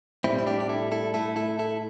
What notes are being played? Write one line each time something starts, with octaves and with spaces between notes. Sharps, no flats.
A2 G3 C4 E4
E4
D4 G4
G4
E4 A4
E4 A4
A2 A3 E4 A4
E4 A4
E4 A4